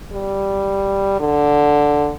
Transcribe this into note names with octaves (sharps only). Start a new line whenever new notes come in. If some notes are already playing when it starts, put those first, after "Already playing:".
G3
D3